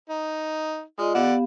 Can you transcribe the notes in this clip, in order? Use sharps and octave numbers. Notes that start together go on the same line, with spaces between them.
D#4
G#3 F4 D5 D#5
B3 G4 D5 F5 F#5